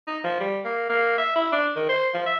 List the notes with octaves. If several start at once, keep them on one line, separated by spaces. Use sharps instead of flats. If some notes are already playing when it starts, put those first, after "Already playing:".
D#4
F3
G3
A#3
A#3
E5
E4
D4
D#3
C5
F3
E5